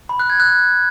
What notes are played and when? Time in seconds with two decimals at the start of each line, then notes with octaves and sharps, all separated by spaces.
0.09 B5
0.19 F#6
0.30 G#6
0.40 F#6